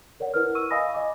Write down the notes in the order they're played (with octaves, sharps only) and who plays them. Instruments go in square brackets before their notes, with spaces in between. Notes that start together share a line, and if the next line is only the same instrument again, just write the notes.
[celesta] A#4 C#5 D5 F#5
E4 A#4 B4 F6
C#6 E6 D#7
D#5 F5 G#5 B5 D#6 A#6
D#5 D6